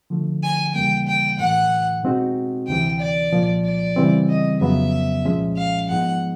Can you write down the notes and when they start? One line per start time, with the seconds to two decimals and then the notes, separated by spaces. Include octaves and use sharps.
0.10 D3 F3 A3
0.43 G#5
0.75 D#2 C#3 E3 G3 A#3 G5
1.07 G5
1.39 A2 E3 A3 F#5
2.03 B2 G#3 C4 D#4 F#4
2.67 D2 C3 E3 G5
3.00 D5
3.31 C2 A#2 F3
3.65 D5
3.96 C#3 E3 G3 C4
4.28 D#5
4.60 F2 C#3 F#3 B3 E5
5.25 C2 A#2 F3 G#3 C#4
5.57 F5
5.89 G#2 F3 G#3 B3 D#4 F#5